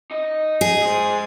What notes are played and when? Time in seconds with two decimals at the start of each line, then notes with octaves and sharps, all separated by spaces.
0.11 D#4 D#5
0.61 G#4
0.82 G#3 C5